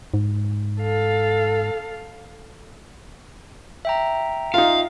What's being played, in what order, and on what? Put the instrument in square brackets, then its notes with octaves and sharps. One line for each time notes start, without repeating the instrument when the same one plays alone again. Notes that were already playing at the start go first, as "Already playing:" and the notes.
[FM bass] G#2
[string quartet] A4 F5
[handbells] E5 G5 A#5
[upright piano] D#4 F4 [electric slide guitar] F5